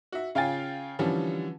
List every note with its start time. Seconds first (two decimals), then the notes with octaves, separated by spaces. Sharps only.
0.12 F#4 E5
0.35 C#3 F4 F5 G5 G#5 A6
0.99 D3 E3 F3 G3 C#4